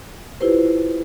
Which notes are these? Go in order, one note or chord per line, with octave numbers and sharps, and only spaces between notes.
E4 F4 G4 B4 C5